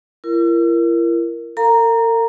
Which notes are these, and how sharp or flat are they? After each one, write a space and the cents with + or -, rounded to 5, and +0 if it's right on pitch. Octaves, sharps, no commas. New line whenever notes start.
E4 +45 A#4 +0
A#4 -45 F5 +0 A#5 +0